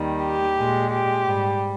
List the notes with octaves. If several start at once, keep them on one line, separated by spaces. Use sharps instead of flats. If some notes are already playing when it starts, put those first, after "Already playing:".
Already playing: D#2 D#3 G3
G4
A#2 G#3
G4
G#2 G3